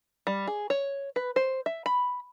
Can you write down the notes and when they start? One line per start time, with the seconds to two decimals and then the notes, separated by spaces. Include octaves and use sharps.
0.27 G3
0.47 G#4
0.70 C#5
1.16 B4
1.36 C5
1.66 E5
1.86 B5